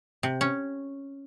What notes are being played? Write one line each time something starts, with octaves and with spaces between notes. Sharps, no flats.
C3
C#4